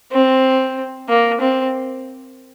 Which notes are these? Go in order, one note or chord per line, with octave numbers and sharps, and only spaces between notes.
C4
A#3
C4